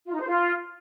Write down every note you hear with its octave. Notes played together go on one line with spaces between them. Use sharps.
F4
D#4
C5
F4